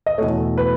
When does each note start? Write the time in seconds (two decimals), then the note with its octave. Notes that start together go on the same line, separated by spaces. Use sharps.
0.06 D#5
0.18 E2 B2 A3 C#5
0.58 B4